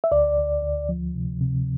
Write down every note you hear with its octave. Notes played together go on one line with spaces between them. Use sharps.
E5
D2 D5
D2
D2
F3
C3
C3